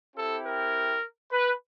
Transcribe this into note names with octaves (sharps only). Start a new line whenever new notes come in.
C4 E4 G4 A4
A#4
B4